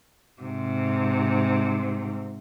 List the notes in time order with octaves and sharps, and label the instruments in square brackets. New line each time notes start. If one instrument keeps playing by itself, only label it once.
[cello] G#2 C3